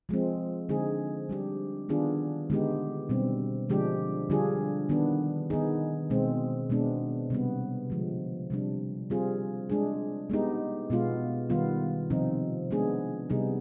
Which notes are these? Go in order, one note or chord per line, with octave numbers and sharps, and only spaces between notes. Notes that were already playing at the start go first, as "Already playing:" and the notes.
F3 G#3 C4
D3 G#3 C4 D#4 G#4
G3 D4 G4
D#3 B3 D4 F4 G#4
D3 G#3 B3 D#4 G4
B2 G3 C4
D3 F3 G#3 D4 G4
D3 G3 D4 F4 G#4
D#3 B3 D4
D#3 B3 D#4 G#4
B2 G#3 C4
B2 G#3 B3 D4
C3 G3 B3
D3 F3 G#3
C3 G3 D4
G3 C4 F4 G#4
G#3 D4 G#4
G#3 B3 D#4 G4
B2 G#3 B3 F4
D#3 G3 B3 F4
C3 F3 C4 D#4
G#3 B3 D4 G#4
C3 G3 B3 D#4 G#4